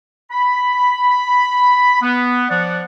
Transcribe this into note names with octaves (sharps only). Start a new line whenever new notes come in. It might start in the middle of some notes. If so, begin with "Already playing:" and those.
B5
B3
F3 D5 F#5